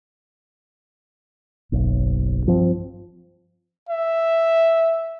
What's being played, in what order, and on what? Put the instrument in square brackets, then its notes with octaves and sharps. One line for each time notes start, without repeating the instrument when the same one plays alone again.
[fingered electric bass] F#1 B1
G2 F3 C4
[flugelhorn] E5